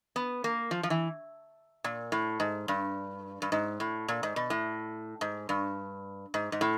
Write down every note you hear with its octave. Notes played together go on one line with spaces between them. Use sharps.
B3
A#3
F3
F3
E3
A#2
A2
G#2
G2
G2
G#2
A2
A#2
G#2
B2
A2
G#2
G2
G#2
G#2
A2